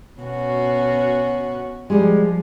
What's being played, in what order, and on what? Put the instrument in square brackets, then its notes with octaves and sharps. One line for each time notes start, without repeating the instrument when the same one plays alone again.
[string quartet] B2 C#4 F#4
[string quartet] F3 [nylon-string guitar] G3 G#3